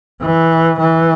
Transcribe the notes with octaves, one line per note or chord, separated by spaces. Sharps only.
E3
E3